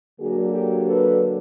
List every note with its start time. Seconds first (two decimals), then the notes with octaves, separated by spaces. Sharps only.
0.20 D3 F#3 A#3 D4 F#4 G#4
0.53 G4 A4
0.87 A4 B4